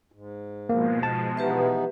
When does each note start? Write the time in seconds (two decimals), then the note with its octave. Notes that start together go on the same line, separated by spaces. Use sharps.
0.12 G#2
0.69 B2 F3 G#3 A#3
1.03 A5
1.37 E3 B3 D#4 G4 B4 E5